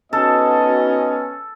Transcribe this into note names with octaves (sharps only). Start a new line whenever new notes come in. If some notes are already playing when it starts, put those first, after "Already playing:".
B3 C#4 D#4 F#4 A4 D#5